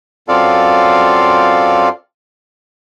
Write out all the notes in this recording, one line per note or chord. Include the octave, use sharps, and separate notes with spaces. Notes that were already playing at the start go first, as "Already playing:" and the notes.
F#2 C4 F4 A4 D5 F5